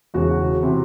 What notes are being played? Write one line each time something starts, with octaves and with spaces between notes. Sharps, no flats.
E1 E2 C#3 F#4
C3 E3